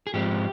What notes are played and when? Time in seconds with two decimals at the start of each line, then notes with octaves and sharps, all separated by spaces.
0.07 G#4
0.14 G#2 F3 G#3 C4 G4